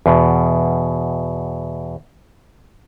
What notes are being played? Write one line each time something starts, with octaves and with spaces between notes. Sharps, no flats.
E2 B2